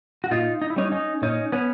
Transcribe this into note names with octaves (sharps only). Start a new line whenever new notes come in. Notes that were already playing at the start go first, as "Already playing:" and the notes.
F#4
A#2 D#4 F4
D#4
E4
G3 C#4 D#4
C#4 D#4
A#2 C#4 D#4
B3 C#4